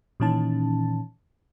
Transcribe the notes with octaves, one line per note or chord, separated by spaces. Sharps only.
A#2 D#3 E3 C#4 D#4 A5